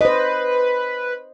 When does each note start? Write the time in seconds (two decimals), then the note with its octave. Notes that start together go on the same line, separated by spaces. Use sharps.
0.01 B4 C5 D#5